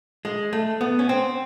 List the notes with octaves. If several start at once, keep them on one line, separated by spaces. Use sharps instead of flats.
G#3
A3
B3
C#4
C4